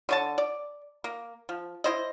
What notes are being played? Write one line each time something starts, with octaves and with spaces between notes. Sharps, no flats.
D3 C#5 A5
D5
A#3
F3
E4 C5 D#5